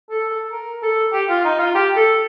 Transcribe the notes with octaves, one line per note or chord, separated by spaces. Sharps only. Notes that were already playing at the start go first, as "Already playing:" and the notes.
A4
A4
A#4
A4
G4
F4
D#4
F4
G4
A4